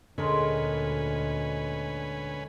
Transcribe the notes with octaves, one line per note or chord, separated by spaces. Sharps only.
D2 A#2 D3 G#3 C#4 A#4 B4 G#5